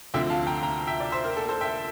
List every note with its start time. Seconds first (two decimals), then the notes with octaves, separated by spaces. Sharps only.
0.14 D2 D3 F3 C4 E5 G5
0.30 F5 A5
0.47 G5 A#5
0.63 G5 A#5
0.87 E5 G5
1.00 D5
1.12 C5 E5
1.24 A#4
1.37 A4
1.49 A4 C5
1.61 E5 G5